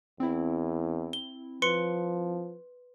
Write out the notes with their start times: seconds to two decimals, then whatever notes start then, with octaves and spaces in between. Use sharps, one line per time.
0.20 E2 C4 E4
1.13 G7
1.62 F3 B4 C6 C#7